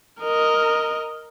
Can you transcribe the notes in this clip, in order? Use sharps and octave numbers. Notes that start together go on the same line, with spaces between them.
A#4 D#5